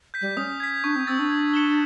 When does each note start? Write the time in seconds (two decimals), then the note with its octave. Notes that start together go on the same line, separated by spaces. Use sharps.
0.14 G6 B6
0.21 G3
0.37 C#4 D#6
0.60 G#6 B6
0.84 D4 C#6
0.96 C4
1.07 C4 E6 A6
1.19 D4
1.30 G#6
1.54 C#7 E7 G7